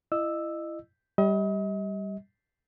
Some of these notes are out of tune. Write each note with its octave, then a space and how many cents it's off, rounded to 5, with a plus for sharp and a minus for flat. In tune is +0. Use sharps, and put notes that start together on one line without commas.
E4 +25 D#5 -25 E6 +0
G3 +0 D#5 +40